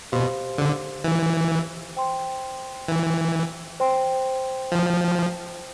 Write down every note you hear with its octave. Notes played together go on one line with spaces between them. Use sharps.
B2 G4 C5 F5 C6
D3
E3
C5 G5 C6
E3
C5 G5 C6
F3